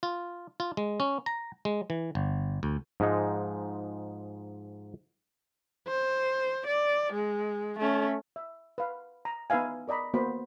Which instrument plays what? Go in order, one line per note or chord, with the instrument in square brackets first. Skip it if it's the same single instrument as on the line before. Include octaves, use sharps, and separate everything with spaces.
[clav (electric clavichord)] F4
F4
G#3
C#4
A#5
G#3
E3
G1
D2
G#2 F3 G#3 D#4
[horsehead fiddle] C5
D5
G#3
A3 C#4
[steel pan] E5
B4 F5
A#5
B3 D#4 B4 E5 F5 G#5
A#4 D5 D#5 A#5 B5
A#3 B3 F#4 C5 B5